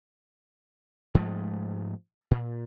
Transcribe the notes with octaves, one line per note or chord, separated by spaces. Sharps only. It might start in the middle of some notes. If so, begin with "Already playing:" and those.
G#2 F3 G#3 A3
A#2